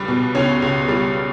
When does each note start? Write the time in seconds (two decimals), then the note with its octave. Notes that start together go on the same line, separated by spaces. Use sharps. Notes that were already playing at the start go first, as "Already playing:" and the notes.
Already playing: C#2 G3 B4
0.08 B2
0.35 C#2 C#4 C#5
0.62 C#2
0.89 G3